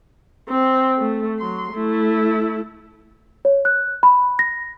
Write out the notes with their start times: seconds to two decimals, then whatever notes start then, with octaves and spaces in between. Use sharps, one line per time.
0.48 C4
0.97 A3
1.39 F#3 C6
1.72 A3 E4
3.45 C#5
3.65 F#6
4.03 B5
4.39 A#6